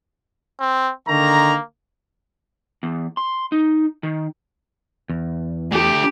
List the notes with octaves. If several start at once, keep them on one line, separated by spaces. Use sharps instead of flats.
C4
D3 D#3 A#3 A#5
E2
C6
D#4
D#3
E2
A3 D4 G4